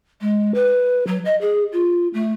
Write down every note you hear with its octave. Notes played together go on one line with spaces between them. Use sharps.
G#3
B4
F#3
D#5
G#4
F4
A3